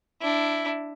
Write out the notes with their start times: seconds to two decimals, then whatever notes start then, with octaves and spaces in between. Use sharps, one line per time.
0.21 D4 E4